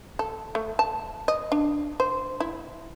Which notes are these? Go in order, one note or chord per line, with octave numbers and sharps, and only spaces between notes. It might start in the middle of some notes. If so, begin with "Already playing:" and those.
A4
A3
A5
D#5
D4
C5
E4